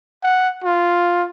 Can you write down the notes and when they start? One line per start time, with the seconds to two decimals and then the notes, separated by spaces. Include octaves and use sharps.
0.23 F#5
0.64 F4